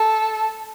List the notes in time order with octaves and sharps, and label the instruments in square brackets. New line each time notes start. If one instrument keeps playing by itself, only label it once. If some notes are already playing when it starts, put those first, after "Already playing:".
Already playing: [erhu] A4